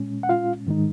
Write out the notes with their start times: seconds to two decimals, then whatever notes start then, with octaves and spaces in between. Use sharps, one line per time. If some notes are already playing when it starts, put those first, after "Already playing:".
Already playing: A#2 G#3 C#4
0.23 F#5
0.29 F4 F5
0.67 G#2 D#3 G#3 D#4